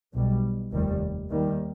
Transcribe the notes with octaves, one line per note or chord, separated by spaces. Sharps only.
B1 B2 G3
F1 D#2 D#3 G3
D#2 D#3 G3